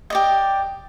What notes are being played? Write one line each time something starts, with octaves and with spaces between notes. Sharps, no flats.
G4 D5 D#5